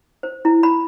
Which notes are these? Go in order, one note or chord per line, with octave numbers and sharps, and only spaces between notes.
C5
E4
B5